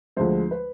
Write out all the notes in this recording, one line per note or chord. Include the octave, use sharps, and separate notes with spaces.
D2 D3 F3 G#3 C5
B4